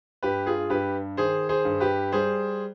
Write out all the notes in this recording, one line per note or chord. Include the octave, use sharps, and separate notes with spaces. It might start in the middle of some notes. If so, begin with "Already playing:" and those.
G2 G4 B4
F4 G#4
G2 G4 B4
D#3 G#4 C5
G#4 C5
G2
G4 B4
G3 G#4 C5